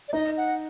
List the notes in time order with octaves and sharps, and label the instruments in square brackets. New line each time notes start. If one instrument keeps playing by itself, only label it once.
[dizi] D5
[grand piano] D#4 [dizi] D#5
[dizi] F#5